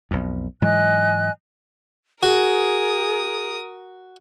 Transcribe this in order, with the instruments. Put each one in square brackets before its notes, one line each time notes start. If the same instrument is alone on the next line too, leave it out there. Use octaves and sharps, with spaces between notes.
[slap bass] B1 F2
[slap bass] G#2 E3 F#3 [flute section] D#5 G#5 F#6
[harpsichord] F#4 [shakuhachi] G#4 [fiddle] A#4 D#6